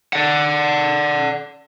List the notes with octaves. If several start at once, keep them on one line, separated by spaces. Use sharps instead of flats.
D5 F#5